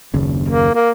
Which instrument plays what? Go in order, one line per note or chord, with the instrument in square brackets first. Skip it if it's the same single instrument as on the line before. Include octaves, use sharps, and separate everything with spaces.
[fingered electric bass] F#1 D#2 C#3
[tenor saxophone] A#3
A#3